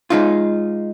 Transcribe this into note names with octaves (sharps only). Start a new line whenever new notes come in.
G#3 D#4 F4